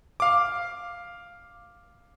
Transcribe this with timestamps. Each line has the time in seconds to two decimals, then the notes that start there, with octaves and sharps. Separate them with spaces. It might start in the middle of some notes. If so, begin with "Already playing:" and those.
0.20 F5 D6